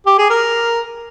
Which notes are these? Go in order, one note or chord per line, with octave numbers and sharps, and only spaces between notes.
G4
G#4
A#4